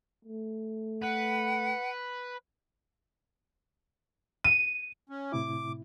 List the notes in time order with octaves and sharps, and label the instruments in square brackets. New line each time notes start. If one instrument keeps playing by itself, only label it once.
[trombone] A3
[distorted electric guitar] B4 [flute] F#5
[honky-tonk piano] D#7
[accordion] C#4
[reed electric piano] A2 C3 E4 [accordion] D6